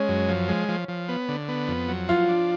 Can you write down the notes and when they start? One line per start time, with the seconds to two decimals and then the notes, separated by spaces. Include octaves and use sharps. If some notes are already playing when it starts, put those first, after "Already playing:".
Already playing: G#3 C#4
0.08 F#2
0.29 F3
0.49 G#3
0.69 F3
0.89 F3
1.09 B3
1.28 D3
1.48 B3
1.68 F2
1.89 F#3
2.08 F3 F4
2.28 D4